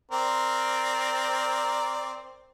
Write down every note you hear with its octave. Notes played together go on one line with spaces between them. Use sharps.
C4 A#4 D5